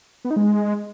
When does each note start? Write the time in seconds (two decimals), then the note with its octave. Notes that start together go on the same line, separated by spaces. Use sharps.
0.25 B3
0.31 D#4
0.36 G#3